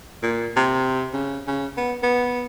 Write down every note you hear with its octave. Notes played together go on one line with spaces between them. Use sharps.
A#2
C3
C#3
C#3
B3
B3